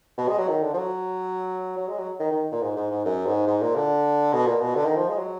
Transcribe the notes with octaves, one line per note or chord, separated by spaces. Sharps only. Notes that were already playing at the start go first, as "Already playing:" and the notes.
B2
G#3
F#3
D#3
D3
F3
F#3
F#3
G#3
F#3
D#3
D#3
A#2
G#2
G#2
G#2
F#2
G#2
G#2
A#2
D3
B2
A#2
B2
D3
D#3
F3
G#3
F#3